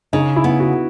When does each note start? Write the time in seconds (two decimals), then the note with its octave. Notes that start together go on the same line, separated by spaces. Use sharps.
0.13 C#3 D#4
0.36 E4
0.44 B3
0.60 F#4